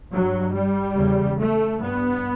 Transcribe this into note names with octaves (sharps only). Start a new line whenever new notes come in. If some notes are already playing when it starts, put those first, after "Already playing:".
G2 F#3
G3
E2 C#3
A3
G2 B3